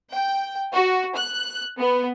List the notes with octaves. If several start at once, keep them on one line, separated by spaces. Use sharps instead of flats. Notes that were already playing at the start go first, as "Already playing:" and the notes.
G5
F#4
F#6
B3